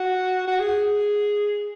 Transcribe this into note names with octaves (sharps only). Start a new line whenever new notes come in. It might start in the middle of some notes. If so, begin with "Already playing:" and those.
Already playing: F#4
F#4
G#4